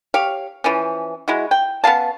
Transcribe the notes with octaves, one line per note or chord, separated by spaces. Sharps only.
G4 C#5 F5
E3 F3 C#4
G#3 E4 F#4
G5
B3 C#4 F5 A5